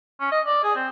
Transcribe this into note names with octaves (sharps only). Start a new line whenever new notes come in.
C#4
D#5
D5
G#4
C4